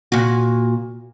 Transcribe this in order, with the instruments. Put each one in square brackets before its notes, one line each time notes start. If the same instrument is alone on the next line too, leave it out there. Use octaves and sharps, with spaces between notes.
[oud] A#2 F#4